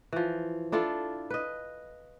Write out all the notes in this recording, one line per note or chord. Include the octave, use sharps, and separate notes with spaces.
E3 F3
D4 E4 F4 A4
B4 D#5